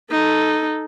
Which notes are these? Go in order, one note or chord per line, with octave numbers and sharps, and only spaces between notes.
D#4 A4